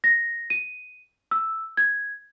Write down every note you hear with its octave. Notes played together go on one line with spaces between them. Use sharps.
A#6
D#7
E6
G#6